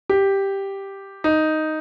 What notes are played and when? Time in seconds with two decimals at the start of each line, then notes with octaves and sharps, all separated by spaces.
0.09 G4
1.24 D#4